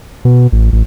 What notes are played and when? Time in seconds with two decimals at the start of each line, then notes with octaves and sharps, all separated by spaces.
0.25 B2
0.53 A1
0.73 A1